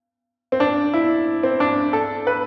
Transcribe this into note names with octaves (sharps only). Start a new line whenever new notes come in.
C4
D4
E4
C4
D4
A4
B4